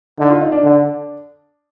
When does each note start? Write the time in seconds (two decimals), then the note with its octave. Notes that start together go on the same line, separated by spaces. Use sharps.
0.19 D3 D#4
0.30 F4
0.41 D#4
0.52 D4
0.63 D3 D4